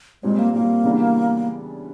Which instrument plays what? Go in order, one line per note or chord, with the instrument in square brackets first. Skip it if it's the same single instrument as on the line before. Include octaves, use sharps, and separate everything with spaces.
[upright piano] A#2 G3 C4 [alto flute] G#3
[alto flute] A#3
[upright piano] A#2 G3 C4 [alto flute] A#3
[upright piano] C#3 E3 G3 B3 D4